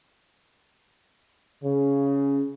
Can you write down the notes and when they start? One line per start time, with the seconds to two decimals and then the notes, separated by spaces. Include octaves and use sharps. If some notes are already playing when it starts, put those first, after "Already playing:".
1.63 C#3